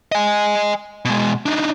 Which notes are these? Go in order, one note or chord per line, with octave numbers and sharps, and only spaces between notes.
D#5 G#5
B2 G#3
D4 D#4